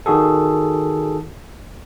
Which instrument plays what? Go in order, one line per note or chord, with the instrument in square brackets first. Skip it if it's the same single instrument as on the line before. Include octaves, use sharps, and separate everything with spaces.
[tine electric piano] D#3 F#4 G#4 A4